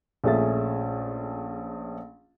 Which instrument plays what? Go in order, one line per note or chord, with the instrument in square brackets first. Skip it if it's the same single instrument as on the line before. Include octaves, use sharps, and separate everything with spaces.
[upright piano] A#1 A3 C#4 G#4 E5 A6